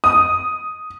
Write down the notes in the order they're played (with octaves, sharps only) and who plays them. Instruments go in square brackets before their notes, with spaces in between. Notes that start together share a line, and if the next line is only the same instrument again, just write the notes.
[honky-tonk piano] D#6